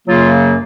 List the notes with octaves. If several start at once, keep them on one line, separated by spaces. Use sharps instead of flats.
F#2 C#3 F#3 A#3 F4